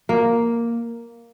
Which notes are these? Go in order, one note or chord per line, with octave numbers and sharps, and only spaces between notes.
A#3